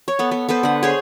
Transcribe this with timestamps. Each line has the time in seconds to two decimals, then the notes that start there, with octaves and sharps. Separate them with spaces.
0.08 C#5
0.19 B3 A4
0.31 B3
0.49 B3 A4 B4 C5
0.63 D3 F#5
0.83 G#4 C5 C#5